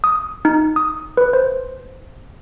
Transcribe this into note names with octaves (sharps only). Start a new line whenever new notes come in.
D#6
D#4
D#6
B4
C5